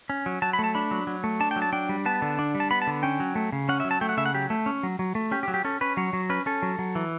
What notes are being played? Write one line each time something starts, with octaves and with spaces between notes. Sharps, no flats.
C#4
F#3
F#3 A5
B5
A3 A5
D4 B5
F#3
F#3
A3
D4 A5
G5
F#3
A5
D4 G5
G3
B3 A5
D3
D4
G3
A5
B3 B5
A5
D3
C#4 G5
F#3
A3
C#3
C#4 F#5
E5
F#3
A5
A3 G5
F#5
C#3 E5
F#5
F#3 G4
A3
C#4
F#3
F#3
A3
C#4 G4
G4
F#3
G4
C#4 A4
C#4 B4
F#3 C#5
F#3
C#4 B4
C#4 A4
F#3
F#3
E3